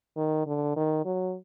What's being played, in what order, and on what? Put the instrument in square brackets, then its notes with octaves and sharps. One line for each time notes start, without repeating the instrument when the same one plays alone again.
[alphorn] D#3
D3
D#3
F#3